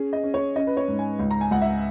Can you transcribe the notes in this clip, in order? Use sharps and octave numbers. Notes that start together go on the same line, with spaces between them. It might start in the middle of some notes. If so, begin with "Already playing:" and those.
Already playing: C#4 G#4
D#5
C#4
C#5
C#4 D#5
B4
C#5
G#2
G#5
C#2
A#5
G#5
C#2 F#5
E5